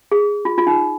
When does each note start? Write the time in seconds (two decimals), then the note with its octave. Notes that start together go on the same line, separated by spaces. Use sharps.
0.12 G#4
0.45 F4
0.58 F4
0.67 D#4